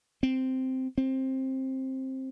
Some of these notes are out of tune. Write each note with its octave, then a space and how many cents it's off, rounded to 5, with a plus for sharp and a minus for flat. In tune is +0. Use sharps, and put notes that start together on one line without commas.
C4 -5
C4 +15